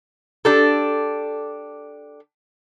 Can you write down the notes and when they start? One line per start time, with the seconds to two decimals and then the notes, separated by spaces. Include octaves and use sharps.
0.45 D4 G4 A4